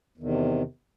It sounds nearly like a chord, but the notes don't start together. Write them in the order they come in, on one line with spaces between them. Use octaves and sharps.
E2 D#3 C3